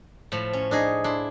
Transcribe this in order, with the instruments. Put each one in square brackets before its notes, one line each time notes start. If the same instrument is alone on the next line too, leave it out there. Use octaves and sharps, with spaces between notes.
[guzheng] A2 F3 A3
C#4
[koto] D4 D#4 G#4
[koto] D4 [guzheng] E4 C6